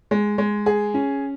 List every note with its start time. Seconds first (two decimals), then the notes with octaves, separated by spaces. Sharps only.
0.11 G#3
0.38 G#3
0.66 G#4
0.94 C#4